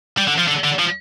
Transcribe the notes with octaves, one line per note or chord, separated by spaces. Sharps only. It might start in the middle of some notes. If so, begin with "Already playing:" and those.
G3
D3
F3
D3
D3
F3